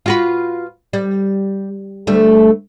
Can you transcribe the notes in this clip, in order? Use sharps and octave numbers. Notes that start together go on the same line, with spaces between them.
F4 F#4 B4
G3
D2 G3 A3